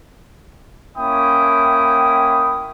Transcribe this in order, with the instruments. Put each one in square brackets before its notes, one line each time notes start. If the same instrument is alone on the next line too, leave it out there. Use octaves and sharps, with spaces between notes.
[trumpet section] A#3 C#4 E4 G5 B5 D#6